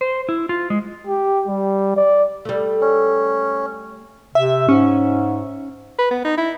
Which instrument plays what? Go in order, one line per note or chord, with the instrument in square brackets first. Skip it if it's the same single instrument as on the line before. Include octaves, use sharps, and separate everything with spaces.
[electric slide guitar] C5
E4
F4
G#3
[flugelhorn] G4
G3
D5
[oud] G3 A3
[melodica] C#4
[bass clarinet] C3 [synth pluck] E5
[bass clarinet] G#2 [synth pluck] C#4
[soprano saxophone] B4
B3
D#4
E4